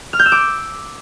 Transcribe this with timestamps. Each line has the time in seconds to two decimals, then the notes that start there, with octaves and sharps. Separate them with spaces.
0.13 F6
0.19 G6
0.26 E6
0.32 D6